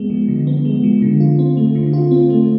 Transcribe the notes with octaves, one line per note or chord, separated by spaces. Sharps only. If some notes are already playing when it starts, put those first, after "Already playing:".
Already playing: G#3 B3
F3
D3
B3
G#3
F3
D3
F4
C4
A3
D3
F4
C4
A3